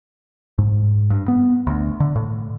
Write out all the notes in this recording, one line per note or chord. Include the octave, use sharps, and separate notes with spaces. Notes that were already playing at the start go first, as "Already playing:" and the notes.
G#2
G2
B3
D2
D3
A2